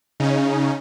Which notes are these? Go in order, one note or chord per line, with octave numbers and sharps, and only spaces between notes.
C#3 C#4 D#4